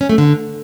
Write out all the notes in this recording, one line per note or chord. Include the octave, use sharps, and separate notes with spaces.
C#4
A3
D3